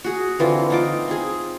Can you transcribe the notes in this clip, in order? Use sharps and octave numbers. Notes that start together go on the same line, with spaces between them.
F#4 G#4
D3 E3 C4 F4
D#4 F4 D6
C4 G#4